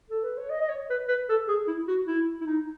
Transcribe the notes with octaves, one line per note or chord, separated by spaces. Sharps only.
A4
B4
C#5
D#5
D#5
C#5
B4
B4
A4
G#4
E4
F#4
E4
E4
D#4